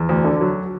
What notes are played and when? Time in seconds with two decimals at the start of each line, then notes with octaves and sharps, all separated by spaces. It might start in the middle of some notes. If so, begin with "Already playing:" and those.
Already playing: E2
0.09 D2
0.24 D3
0.41 F#3